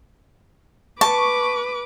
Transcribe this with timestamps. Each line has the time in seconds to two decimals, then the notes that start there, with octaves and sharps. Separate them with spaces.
1.01 B4 A5 C#6 D6